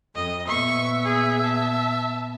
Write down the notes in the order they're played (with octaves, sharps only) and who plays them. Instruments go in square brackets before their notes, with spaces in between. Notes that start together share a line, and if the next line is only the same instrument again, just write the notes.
[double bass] F2 [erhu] D#5
[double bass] A#2 B3 [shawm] E5 [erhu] C#6
[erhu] G#4
A5